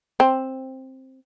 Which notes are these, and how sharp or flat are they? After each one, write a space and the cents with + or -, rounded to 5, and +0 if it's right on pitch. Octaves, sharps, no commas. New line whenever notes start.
C4 +10